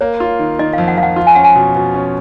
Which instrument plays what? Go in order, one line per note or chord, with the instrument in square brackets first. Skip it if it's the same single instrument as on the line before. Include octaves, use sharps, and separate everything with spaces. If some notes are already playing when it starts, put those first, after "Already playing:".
[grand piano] A#3 [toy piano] C#5
[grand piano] F4
D#3
[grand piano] D#3 [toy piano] D#5
[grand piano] F2 [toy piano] F5
[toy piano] F#5
[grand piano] F2 [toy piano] F5
[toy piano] F#5
[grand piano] F4
[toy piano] G#5
[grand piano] C#4 [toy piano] F#5
[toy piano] G#5
[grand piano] B2
B2
C#4